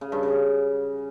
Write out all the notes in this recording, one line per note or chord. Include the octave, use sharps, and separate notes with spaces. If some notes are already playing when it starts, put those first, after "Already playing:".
C#3
G2
C#3